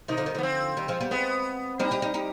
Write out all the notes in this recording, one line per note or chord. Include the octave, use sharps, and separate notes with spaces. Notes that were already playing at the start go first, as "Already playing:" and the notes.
C3 D#3 D#4
D3 F3
D#3 G3
D3 F3 B3
C4
D#3 G3
F3 G#3
G3 B3
G#3 B3 C4
G3 C4 D#4
D#4 G4
D#4 G4
D#4 G4